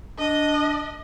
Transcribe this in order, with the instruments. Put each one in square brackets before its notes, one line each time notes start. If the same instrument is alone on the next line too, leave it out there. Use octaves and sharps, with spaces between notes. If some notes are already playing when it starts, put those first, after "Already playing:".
[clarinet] D4 [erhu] D#5